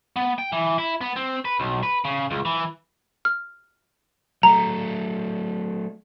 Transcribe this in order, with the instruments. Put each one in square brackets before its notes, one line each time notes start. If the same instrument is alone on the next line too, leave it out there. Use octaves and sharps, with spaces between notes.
[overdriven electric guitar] B3
G5
E3
E4
B3
C4
B4
B1
B4
C#3
C#2
E3
[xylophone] F6
[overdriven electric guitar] F#3 A3 [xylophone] A#5